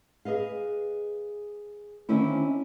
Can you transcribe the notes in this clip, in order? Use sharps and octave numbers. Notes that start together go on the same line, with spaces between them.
G#4 B4 D#5 F5
D3 D#3 A#3 C4 C#4 E4